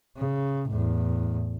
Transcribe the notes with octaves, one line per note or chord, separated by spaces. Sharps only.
C#3
E2 A2